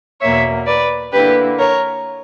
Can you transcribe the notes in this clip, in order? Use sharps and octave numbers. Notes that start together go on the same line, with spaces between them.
E2 B2 A#3 C#5 E5
B4 D5
D3 A#3 E4 G4 B4
A#4 C#5